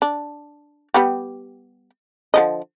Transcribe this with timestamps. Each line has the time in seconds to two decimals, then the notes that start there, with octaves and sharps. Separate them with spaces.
0.02 D4
0.94 G3 B3 G4
2.34 D3 F3 D#5